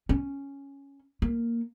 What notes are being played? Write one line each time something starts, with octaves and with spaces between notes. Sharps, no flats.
C#4
A#3